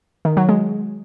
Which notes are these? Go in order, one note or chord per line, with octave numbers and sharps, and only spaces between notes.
D#3
F#3
G#3